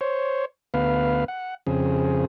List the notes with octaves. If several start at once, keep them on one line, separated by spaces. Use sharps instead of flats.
C5 C#5
D2 B3 B4 F5
F#5
F2 C#3 C4 G#4